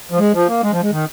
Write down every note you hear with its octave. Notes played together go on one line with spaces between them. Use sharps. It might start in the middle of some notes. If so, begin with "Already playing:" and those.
F3
G#3
F3
A#3
G#3
F3
G#3
D#3